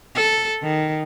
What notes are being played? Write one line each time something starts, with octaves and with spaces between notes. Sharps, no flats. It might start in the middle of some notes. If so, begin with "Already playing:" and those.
A4
D#3